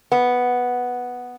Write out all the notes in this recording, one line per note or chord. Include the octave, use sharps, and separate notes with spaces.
B3